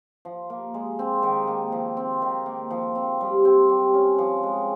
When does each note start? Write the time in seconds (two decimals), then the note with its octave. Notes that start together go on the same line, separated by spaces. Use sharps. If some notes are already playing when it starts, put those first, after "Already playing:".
0.25 F3
0.50 A#3
0.74 G#3
0.99 C4
1.23 D#3
1.47 A#3
1.72 F3
1.97 C4
2.22 D#3
2.46 A#3
2.70 F3
2.95 C4
3.21 G3
3.45 C4
3.69 G3
3.94 C#4
4.18 F3
4.43 G#3